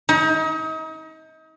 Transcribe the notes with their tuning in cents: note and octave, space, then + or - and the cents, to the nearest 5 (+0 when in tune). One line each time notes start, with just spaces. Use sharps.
D#4 +35